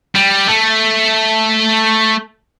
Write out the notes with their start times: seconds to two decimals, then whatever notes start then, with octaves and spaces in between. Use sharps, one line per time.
0.15 G3
0.49 A3